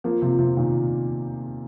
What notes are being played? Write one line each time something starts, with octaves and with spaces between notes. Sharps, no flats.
F3 A#3
C3 F3
C3 F3
A#2 D#3